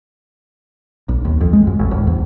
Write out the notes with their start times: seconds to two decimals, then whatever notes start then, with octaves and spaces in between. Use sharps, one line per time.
1.09 B1
1.25 D#2
1.41 F2
1.53 G#3
1.67 F#2
1.79 A1
1.91 D1
2.07 E2